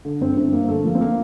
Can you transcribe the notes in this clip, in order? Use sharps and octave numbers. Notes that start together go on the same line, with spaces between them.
D3
G1 C4
G1 C4
G1 A#3
D3 A3
F3 A#3
C4
A#3